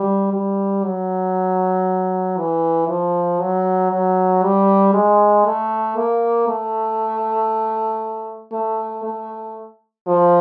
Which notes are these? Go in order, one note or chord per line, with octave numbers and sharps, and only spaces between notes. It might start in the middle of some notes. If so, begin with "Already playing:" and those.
Already playing: G3
G3
F#3
E3
F3
F#3
F#3
G3
G#3
A3
A#3
A3
A3
A3
F3